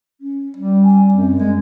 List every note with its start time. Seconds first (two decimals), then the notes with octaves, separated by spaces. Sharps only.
0.21 C#4
0.57 G3
0.85 G#5
1.13 F#2 C4
1.39 G#3